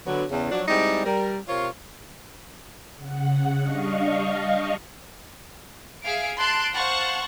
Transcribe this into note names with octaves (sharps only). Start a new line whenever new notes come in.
D3 F#3 B3
E2 C#3
F3 F#3 D4
G3 G#3 C4 D#4 E4 D5
G3 A#4
C3 F4 A#4 C5 C#5
C#3 F#5
G3 D4 D#5 F5 C#6
G#4 E5 F5 D7
A5 C6 F#6 D7
C5 F5 F#5 A5 C#6